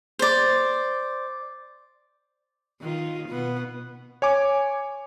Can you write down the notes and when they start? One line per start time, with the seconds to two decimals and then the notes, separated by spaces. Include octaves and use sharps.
0.19 C5 D5
2.81 D#3 F4
3.28 B2 B3
4.22 C#5 G#5 D6